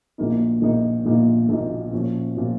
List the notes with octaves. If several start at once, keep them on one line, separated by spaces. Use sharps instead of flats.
A#1 A#2 A#3 D#4
A#1 A#2 A#3 D#4
A#1 A#2 A#3 D#4
A#1 A#2 A#3 D#4
A#2 F3 C#4
A#2 F3 C#4